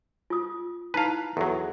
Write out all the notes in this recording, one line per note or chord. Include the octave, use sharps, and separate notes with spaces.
F4 D#6
D#4 E4 B4 F5 A#5
E2 F#3 A4